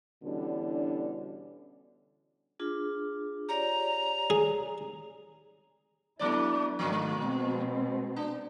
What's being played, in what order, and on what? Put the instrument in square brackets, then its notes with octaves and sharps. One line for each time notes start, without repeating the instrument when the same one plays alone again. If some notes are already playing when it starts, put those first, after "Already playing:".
[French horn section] B2 D3 E3 G3 C#4 D4
[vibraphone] D4 F4 G#4
[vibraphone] G4 C#5 D5 [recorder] A#5
[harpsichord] G#4
[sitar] F#3 A3 D5 [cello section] B3 D4 E4
[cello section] G#2 D#3 A3 [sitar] F3 A#3
[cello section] B2 G#3 C4
[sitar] D4